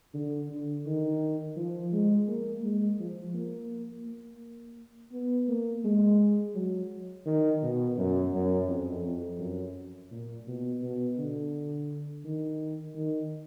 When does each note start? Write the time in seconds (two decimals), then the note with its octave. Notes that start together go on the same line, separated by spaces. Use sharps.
0.14 D3
0.49 D3
0.86 D#3
1.56 F3
1.93 G#3
2.28 A#3
2.63 G#3
3.00 F3
3.34 A#3
4.05 A#3
5.12 B3
5.48 A#3
5.84 G#3
6.55 F#3
7.26 D#3
7.62 B2
7.98 F#2
8.33 F#2
8.68 F2
9.05 F2
9.39 F#2
10.11 A#2
10.47 B2
10.82 B2
11.18 D3
12.25 D#3
12.95 D#3